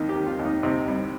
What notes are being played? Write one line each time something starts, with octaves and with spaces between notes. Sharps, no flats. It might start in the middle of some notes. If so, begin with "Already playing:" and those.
Already playing: D#2 D#3 D#4
G4
D#3
F4
D#2
D#4
C3 D#4
C2